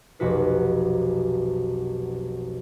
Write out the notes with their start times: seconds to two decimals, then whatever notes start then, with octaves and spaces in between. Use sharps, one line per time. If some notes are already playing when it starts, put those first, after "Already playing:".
0.19 F1 B1 F#4 B4 C5